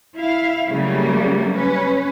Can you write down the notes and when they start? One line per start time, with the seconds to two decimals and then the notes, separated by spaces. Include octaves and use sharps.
0.19 E4 F5
0.72 C#3 F#3 G3 A3 A#3
1.55 C#4 B4